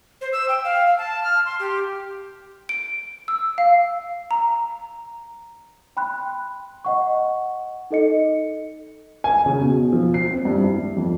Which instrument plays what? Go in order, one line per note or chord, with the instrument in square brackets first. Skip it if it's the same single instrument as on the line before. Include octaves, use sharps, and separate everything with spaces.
[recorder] C5
E6
G5
F5
F5
A5
F6
C6
G4
[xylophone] D7
E6
F5
A#5
[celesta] G5 B5 C6 F#6
D#5 F#5 C#6
D#4 A4 D#5 C#7
[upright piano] G#5
C#3
B2
F3
C7
C4
G2
E4
G2
F2